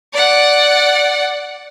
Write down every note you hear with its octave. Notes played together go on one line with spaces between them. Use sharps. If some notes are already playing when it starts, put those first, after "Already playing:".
D5 F#5